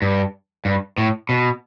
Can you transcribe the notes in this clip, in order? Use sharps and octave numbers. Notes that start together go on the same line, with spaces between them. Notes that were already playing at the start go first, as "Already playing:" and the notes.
G2
G2
A2
B2